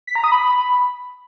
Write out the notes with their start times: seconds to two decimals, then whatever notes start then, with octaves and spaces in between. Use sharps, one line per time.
0.07 B6
0.15 A#5
0.24 D#6
0.32 B5